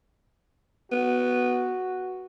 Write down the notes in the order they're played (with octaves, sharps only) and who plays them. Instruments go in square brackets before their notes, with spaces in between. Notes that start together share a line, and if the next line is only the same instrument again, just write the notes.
[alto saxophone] B3 [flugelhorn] F#4